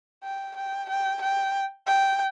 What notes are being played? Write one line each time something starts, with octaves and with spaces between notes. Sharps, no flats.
G5
G5
G5
G5
G5